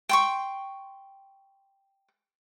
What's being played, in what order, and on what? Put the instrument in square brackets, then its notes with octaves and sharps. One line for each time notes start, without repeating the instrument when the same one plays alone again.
[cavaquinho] G5 C6 C#6